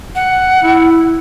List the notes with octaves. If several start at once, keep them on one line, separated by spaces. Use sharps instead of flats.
F#5
E4